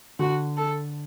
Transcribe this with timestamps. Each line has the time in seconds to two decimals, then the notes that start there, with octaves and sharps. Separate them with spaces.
0.19 D3 F#4
0.57 A4